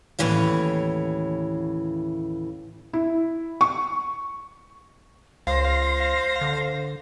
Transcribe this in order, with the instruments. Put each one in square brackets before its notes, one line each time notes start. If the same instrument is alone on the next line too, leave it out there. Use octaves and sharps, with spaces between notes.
[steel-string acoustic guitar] D#2 A2 C#3 E3 C#5 F5
[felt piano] E4
C#6
[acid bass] C#2 [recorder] C5 [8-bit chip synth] F5 [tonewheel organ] C6 A#6
[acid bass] D3